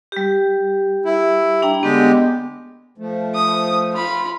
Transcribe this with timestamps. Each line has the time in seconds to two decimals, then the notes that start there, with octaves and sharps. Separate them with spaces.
0.12 G3 G4
1.05 E4
1.62 D4 G5 A#5
1.83 D3 G#3 B3 G4
2.98 F3 A3
3.35 D#6
3.93 F4 B5